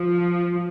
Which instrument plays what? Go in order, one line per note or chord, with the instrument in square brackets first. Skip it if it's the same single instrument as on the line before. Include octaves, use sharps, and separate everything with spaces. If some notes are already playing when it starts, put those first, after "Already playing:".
Already playing: [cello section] F3